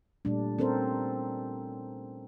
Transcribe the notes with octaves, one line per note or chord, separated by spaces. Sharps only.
A#2 G3 A3 D4
C4 C#4 A4 A#4 C5